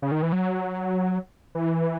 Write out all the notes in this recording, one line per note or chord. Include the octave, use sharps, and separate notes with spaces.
C#3
D#3
E3
F#3
E3